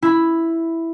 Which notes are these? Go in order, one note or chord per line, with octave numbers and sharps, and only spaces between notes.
E4 B5